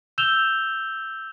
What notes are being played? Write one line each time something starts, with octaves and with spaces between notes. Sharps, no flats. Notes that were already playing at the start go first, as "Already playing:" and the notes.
E6 G6 E7 F7 G7